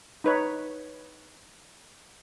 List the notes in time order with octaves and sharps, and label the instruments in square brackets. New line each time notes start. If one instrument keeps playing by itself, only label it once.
[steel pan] D#4 B4 C#5